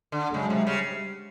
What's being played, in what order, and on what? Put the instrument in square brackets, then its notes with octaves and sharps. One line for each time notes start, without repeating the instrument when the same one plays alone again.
[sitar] D3
[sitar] C#3 [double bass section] F#3 G#3
[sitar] C3
[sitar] C#3 [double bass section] G3